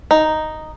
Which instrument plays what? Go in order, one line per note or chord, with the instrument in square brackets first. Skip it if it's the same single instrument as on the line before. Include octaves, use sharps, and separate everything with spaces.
[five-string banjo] D#4